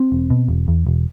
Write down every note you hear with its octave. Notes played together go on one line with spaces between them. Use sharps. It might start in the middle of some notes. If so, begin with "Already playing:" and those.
Already playing: C4
E1
B2
E1
E2
E1